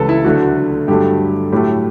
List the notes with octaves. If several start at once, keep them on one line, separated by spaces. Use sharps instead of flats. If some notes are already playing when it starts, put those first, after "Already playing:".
Already playing: C#2 C#3 E3 G3 A4 B4
E4
D2 D3 F#3 A3 F#4
G2 D3 F#3 A3 G4
A2 F#3 A3 G4